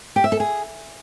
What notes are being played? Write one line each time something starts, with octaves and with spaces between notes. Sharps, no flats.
G4
E5
A4
G#4